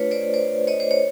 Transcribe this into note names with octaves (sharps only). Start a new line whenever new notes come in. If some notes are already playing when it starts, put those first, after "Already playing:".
Already playing: A3 D4 F4 B4 C#5
C5 D5
C5 D5
C#5 D#5
C5
C#5